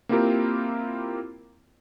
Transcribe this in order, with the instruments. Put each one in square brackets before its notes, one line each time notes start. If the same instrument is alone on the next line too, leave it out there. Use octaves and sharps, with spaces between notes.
[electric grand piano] A#3 C4 E4 F4 G4 A#4